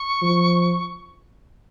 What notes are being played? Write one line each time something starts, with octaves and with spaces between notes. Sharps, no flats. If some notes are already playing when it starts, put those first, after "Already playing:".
Already playing: C#6
F3